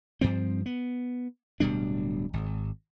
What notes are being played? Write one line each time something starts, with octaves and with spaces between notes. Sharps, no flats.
G2 F3 C4
B3
D1 B2 G3 D4
G#1